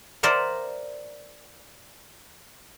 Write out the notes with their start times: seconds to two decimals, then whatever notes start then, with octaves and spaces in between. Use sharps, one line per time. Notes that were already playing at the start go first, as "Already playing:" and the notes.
0.23 A#4 C5 D5 E5 F#5